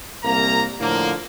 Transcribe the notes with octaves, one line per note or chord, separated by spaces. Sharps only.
C2 A#3 A#5
A2 D3 F3 A#3